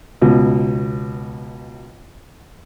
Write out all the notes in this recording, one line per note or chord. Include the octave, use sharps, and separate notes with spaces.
C#2 B2